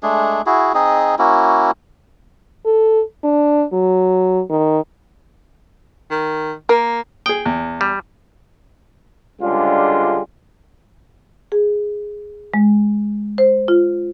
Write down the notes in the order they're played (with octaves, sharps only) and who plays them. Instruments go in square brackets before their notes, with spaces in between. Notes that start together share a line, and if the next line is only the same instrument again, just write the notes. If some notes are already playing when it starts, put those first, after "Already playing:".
[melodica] G#3 A3 D4 G#4
E4 F#4 G#4
C4 D#4 G#4 D#5
A#3 C#4 E4 F#4
[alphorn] A4
D4
F#3
D#3
[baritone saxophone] D#3
[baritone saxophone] A#3 [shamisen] A#4
[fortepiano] G#4 D#6 [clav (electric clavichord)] G5
[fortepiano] E2
[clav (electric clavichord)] G3
[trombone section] C#2 D3 G3 G#3 D4 F4
[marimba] G#4
G#3
C5
F4